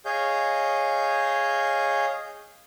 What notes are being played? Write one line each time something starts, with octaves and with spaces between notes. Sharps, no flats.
G#4 C#5 D#5 F5 G6